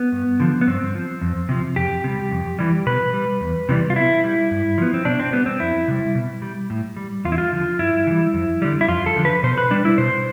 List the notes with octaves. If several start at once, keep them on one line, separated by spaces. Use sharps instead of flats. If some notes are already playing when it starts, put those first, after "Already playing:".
Already playing: B3
G2
D3 F3
B3
G2 C4
F3
F2
C3 F3
F2 G4
C3 G3
F2
E3 G3
B2 B4
G3
E2
C3 E3 G3
F4
B2 E4
G3
G2
F3 B3
C4
B2 D4
C4
G3 B3
C4
F2 E4
C3 G3
B2
G3
A2
G3
E2 F4
E4
F4
D3 F3
G2 E4
E3 G3
F2
D3 G3
E4
F2 F4
A4
D3 F3
B4
B2 C5
B4
G3 D4
E4
B2 C5